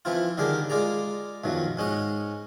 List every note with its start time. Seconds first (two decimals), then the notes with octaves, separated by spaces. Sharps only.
0.05 E3 F3 C4 E4 F4
0.38 D3 D#3 G3 G4 G#4 A#4
0.70 G#3 F4 G#4 D5 A#5
1.44 B1 F#2 D#3 F3 F#3
1.77 G#2 C#4 D#5 F#5